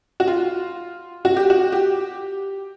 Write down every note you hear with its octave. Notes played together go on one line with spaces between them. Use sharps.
F#4
F4
F#4
G4
F#4
G4